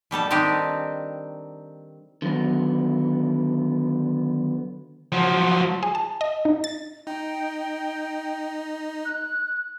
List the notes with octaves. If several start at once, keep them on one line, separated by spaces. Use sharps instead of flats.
B2 G3 A4 A5
D#3 C4 D4 D#4 G4
D3 D#3 F#3 B3
F3 F#3
G#4
A5
D#5
D#4
A6
D#4 G5
F#6